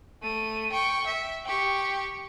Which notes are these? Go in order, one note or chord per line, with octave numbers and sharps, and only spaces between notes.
A3 D#7
G5 C#6
E5
G4 C#6